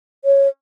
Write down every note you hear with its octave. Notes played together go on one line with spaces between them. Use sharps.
C#5